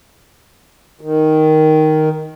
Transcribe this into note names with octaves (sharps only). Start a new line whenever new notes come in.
D#3